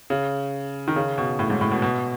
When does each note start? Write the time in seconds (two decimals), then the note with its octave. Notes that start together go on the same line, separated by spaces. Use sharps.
0.10 C#3
0.88 D#3
0.96 C#3
1.18 B2
1.39 A2
1.50 G#2
1.61 A2
1.72 B2
1.82 B2